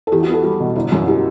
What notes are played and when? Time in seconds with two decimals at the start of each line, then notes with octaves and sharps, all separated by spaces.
0.07 A4
0.12 E2 E4 G4
0.23 F#4
0.28 B3
0.33 F#4 A4
0.43 G3 F#4
0.60 B2
0.75 G1 E4
0.92 F#2 F#4
1.07 E4 G4